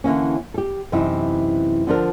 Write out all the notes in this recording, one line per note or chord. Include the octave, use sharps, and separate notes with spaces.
D3 E3 A#3 C#4
G4 A4
F#2 C3 E3 D#4 E4
D3 F3 D4 A#4